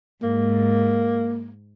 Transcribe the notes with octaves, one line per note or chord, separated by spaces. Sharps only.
G#2 A#3